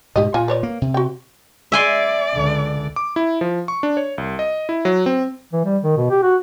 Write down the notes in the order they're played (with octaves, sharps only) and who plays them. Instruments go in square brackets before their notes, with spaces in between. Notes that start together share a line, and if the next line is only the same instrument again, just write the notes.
[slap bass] G#2 B2 [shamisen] G4 D#5
[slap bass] A#2 [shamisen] F4 G#5
[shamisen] B4 C#5 D5
[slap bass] A#3
C3
[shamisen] F#4 G5
[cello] D5 [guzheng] E5 G#5 C6
[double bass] C#2 D3
[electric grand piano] D6
E4
F3
C#6
D4
C#5
C2
D#5
E4
F#3
C4
[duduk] E3
G3
D#3
B2
G4
F#4